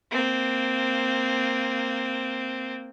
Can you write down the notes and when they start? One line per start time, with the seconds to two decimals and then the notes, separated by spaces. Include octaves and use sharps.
0.11 A#3 C4